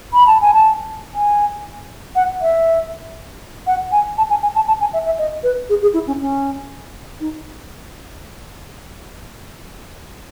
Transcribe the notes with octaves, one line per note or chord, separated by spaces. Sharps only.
B5
A5
G#5
A5
G#5
F#5
E5
F#5
G#5
A5
G#5
G#5
A5
A5
G#5
E5
E5
D#5
B4
G#4
G#4
E4
C#4
C#4
D#4